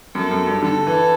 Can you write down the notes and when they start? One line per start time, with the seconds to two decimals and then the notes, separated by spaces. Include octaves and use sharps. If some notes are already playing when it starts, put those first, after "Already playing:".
0.15 F#2 A4
0.31 F#2
0.47 G2
0.63 D3 A4
0.87 E3